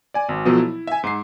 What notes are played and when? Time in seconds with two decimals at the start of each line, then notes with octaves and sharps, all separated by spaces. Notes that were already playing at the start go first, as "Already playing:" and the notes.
0.14 D5 G#5
0.29 G#1
0.45 B2 F3 F#3 A4
0.58 E4
0.87 E5 G#5
1.04 G#2 C7